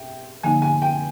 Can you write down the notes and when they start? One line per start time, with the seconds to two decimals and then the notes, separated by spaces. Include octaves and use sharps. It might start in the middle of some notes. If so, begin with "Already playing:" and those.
Already playing: E5 G5
0.43 D3 F3 A#3 D#4 G#5
0.62 G#5
0.82 G5